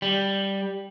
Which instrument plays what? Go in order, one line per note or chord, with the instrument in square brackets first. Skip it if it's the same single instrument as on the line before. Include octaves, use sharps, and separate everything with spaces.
[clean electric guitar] G3